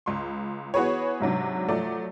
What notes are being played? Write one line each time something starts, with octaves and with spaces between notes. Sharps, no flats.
C#2 C6
E3 B3 F#4 G#4 B4 C#5
G#2 C3 F#3 D4
F3 F#3 A3 D5